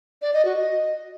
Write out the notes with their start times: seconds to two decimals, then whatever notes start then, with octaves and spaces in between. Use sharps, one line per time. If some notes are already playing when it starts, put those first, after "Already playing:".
0.22 D5
0.33 D#5
0.45 F#4
0.57 D#5